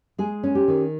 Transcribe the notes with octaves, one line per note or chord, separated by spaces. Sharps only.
G#3 G#4
C#4
G4
D#3